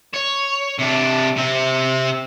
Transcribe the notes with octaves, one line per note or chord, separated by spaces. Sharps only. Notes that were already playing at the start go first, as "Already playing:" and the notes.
C#5
C3 D4
C3 C4